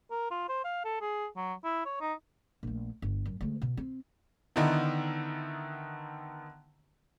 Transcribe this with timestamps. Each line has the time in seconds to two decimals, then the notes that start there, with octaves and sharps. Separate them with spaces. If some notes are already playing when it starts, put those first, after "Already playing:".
0.11 A#4
0.31 F4
0.49 C5
0.64 F5
0.85 A4
1.01 G#4
1.36 F#3
1.64 E4
1.85 C#5
2.01 D#4
2.63 A#1 A3
3.02 G1
3.26 F#2
3.41 D2 G#3
3.62 B2
3.77 C4
4.56 D3 D#3 B3 D#4 E4